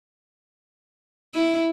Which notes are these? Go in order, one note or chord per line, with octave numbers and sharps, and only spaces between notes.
E4